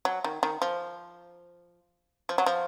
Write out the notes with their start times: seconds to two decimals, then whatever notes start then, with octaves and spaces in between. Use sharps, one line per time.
0.05 F#3
0.24 D#3
0.43 D#3
0.62 F3
2.29 F3
2.38 F#3
2.46 F3